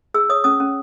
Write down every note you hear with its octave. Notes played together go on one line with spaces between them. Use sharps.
G#4 E6
C#5 D#6
C#4 D#6
C#4